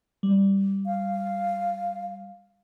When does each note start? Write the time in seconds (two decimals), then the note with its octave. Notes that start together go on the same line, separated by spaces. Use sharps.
0.23 G3
0.86 F5